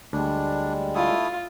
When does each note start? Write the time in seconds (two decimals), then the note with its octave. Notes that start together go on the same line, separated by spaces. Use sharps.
0.13 D2 G3 G#3 D4
0.95 A3 E4 F4 D#6